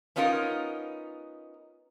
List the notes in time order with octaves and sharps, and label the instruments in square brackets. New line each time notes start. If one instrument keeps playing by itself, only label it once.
[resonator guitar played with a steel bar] B3 C#4 D#4 F4 A4 A#4